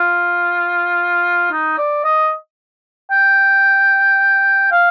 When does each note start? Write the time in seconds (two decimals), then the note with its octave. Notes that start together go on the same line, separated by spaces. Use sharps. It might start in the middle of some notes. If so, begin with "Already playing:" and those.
Already playing: F4
1.51 D#4
1.77 D5
2.04 D#5
3.11 G5
4.71 F5